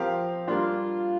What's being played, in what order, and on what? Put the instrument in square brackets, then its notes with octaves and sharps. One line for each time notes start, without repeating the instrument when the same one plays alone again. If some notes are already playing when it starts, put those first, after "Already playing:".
Already playing: [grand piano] F3 C4 G4 A#4 F5
[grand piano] G3 A#3 D4 [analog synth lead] F4